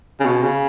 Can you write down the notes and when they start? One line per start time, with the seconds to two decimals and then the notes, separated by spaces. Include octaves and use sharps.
0.20 C#3
0.25 B2
0.43 C#3